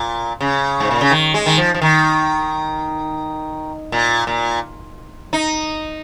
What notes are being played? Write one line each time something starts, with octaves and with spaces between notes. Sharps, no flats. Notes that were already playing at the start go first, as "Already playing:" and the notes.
Already playing: A#2
C#3
G#2
A#2
C#3
D#3
G#3
D#3
F3
F3
D#3
A#2
A#2
D#4